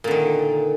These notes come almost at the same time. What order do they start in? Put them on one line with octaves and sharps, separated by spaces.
A#2 D3 D#3